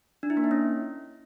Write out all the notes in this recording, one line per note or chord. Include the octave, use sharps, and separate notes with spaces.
D4
E4
A#3
D#4
C#4